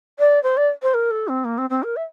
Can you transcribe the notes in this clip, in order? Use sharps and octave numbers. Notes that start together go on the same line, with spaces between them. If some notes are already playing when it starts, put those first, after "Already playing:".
D5
C5
D5
C5
A#4
A4
C4
A#3
C4
C4
A#4
E5